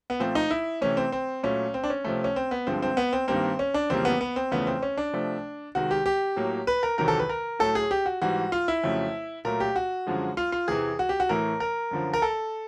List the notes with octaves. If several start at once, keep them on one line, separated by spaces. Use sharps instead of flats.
B3
A#2 F3 A3 C4
D#4
E4
C3 E3 A3 C#4
C4
C4
A#2 F#3 A3 C#4
C4
D4
C#4
C3 F3 A3
C#4
C4
B3
G2 D3 F3 G#3 C4
C4
B3
C4
G2 D#3 G3 A#3 C4
C#4
D4
F2 C#3 E3 G3 A#3 C4
B3
B3
C4
E2 C#3 F3 A3 B3
C4
C#4
D4
C3 F3 A3
C3 D#3 G#3 F#4
G4
G4
A2 F#3 A#3
B4
A#4
E2 C3 D#3 F#3 A#4
A4
B4
A#4
A2 F#3 A3 A4
G#4
G4
F#4
G#2 E3 G3 F#4
F4
E4
F2 C#3 F#3 A3
A#2 F#3 A3 A#4
G4
F#4
F#2 D3 F3 G#3
F4
F4
E2 C3 E3 G#4
F#4
G4
F#4
A2 E3 A3 A#4
A#4
F#2 D3 F3
A#4
A4